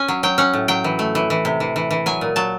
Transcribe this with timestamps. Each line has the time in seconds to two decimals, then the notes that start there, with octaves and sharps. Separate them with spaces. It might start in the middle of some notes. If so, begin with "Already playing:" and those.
Already playing: C#4 G#5
0.08 F#3
0.23 F#3 G5
0.38 C#4 F#5
0.53 A2
0.68 F#3 G5
0.84 E3
0.99 A3
1.15 E3
1.30 E3
1.45 C3
1.60 E3
1.76 E3
1.91 E3
2.06 F#3 G#5
2.21 A#2
2.36 F#3 A5